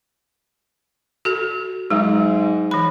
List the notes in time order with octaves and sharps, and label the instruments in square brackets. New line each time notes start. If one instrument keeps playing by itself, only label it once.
[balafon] F#4 A4
[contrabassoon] G#2 [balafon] F#3 G#3
[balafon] E3 B5